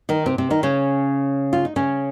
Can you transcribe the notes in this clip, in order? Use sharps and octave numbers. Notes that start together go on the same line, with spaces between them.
D#3 D#4
C3 C4
C3 C4
D#3 D#4
C#3 C#4
F4
D#4
C#3 C#4